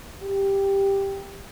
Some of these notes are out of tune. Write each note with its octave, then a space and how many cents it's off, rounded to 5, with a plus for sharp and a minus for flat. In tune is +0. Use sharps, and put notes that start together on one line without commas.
G4 +5